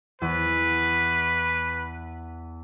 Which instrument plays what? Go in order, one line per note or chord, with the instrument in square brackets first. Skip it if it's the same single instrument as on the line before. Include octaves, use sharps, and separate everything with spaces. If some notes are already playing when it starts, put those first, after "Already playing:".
[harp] E2 [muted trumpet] B4